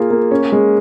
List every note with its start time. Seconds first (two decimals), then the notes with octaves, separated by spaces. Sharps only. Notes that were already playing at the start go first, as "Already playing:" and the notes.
Already playing: A#3 F4 G#4
0.10 A#3
0.31 C#4
0.52 G#3